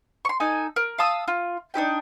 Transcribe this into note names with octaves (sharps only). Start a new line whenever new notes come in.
C6 C#6
D#4 A4 G#5
A#4
F5 A5 D#6 E6
F4
D4 D#4 G4 G5